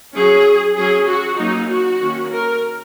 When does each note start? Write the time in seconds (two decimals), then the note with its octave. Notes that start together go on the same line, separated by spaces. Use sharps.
0.14 F#3 C#4 G#4
0.77 F#3 C#4 G#4
1.08 F#4
1.38 F#3 A#3 C#4 D#4
1.70 F#4
2.01 D#3 A#3 C#4
2.32 A#4